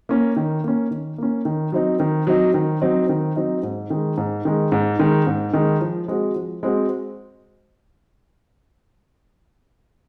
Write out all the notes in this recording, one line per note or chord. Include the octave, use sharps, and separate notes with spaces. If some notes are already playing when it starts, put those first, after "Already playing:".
A#3 C#4
D#3
A#3 C#4
D#3
A#3 C#4
D#3
F#3 C4 D#4
D#3
F#3 C4 D#4
D#3
F#3 C4 D#4
D#3
F#3 C4 D#4
G#2
D#3 G#3
G#2
D#3 G#3
G#2
D#3 G#3
G#2
D#3 G#3
F3
G#3 C4 F#4
F3
G#3 C4 F#4